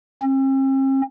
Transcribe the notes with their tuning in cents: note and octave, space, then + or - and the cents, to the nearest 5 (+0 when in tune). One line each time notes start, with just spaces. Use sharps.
C4 +45